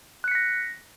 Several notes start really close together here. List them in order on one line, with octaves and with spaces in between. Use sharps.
F#6 C#7 B6 A#6